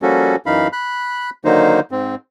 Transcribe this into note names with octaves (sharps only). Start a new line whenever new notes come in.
F3 G3 A#3 C#4 F#4 A4
F#2 E3 D#4 F5 B5
B5 F#6
D3 D#3 F#3 A#3 D#4 C5
G#2 C4